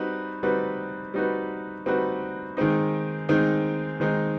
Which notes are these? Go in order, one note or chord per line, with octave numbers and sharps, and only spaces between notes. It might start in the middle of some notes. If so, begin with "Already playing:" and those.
Already playing: G3 C4 D#4 F#4 B4
G3 C4 D#4 F#4 B4
G3 C4 D#4 F#4 B4
G3 C4 D#4 F#4 B4
D#3 G#3 C4 D#4
D#3 G#3 C4 D#4
D#3 G#3 C4 D#4